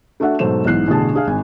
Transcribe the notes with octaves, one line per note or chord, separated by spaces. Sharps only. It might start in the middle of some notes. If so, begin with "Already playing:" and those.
A3 D4 F#4 E5 F#5
G#2 B2 F#3 A3 C5 E7
B1 G#2 E3 F#6 C7
A1 B2 D3 G#4 A5
D4 G#4 F5
G#1 G#5